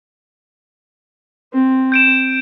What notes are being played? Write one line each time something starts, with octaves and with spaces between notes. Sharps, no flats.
C4
G6 D7 E7